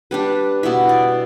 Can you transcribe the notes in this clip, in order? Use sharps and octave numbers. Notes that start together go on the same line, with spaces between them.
G3 D4 B4
B2 B3 E4 E5
D5